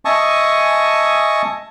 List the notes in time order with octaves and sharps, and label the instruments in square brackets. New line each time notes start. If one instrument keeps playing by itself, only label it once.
[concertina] D#5 E5 G#5 A5 C#6 D#6